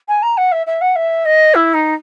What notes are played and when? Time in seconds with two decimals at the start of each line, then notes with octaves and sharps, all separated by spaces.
0.08 G#5
0.22 A#5
0.37 F#5
0.52 E5
0.66 E5
0.81 F#5
0.96 E5
1.25 D#5
1.54 E4
1.74 D#4